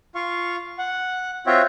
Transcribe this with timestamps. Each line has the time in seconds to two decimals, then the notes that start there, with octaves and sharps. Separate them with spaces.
0.15 F4 F5 C#6
0.79 F#5
1.47 C4 F4 F#4 C#5 E5 G5